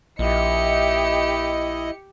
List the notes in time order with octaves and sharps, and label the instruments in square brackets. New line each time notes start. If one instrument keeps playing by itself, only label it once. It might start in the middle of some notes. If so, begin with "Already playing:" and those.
[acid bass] A#1 [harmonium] E4 D#5 [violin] G4 C#7